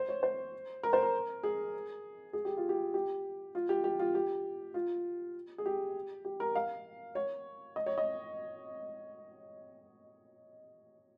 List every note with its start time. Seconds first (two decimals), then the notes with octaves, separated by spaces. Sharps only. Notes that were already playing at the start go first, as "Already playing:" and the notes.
Already playing: C5
0.09 C#5
0.23 C5
0.83 A#4
0.93 C5
1.03 A#4
1.43 G#4
2.33 G#4
2.45 G4
2.57 F4
2.69 G4
2.94 G4
3.55 F4
3.69 G4
3.84 G4
3.99 F4
4.15 G4
4.74 F4
5.58 G#4
5.66 G4
6.25 G4
6.40 A#4
6.55 F5
7.15 C#5
7.76 D#5
7.86 C#5
7.98 D#5